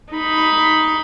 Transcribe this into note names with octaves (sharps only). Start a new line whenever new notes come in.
D#4 B5